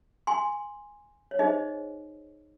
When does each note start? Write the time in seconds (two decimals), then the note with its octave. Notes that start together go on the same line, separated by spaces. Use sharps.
0.27 G#5 C6
1.31 C#5
1.39 D#4 G#4 C5 D#5